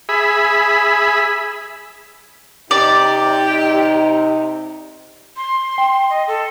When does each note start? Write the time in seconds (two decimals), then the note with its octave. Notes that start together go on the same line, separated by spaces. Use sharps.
0.09 G#4 E5 B5
2.71 C3 D#4 G4 D5
5.37 C6
5.78 G5
6.10 D#5
6.28 A4